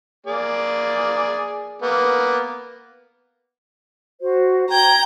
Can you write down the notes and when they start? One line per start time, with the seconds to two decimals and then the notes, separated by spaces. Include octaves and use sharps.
0.26 A#3 G#4 D5
1.82 A#3 B3
4.22 F#4 C5
4.70 G5 A#5 G6 G#6